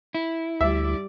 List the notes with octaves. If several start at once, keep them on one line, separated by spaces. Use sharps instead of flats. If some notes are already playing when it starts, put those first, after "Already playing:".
E4
D2 G3 D5 E5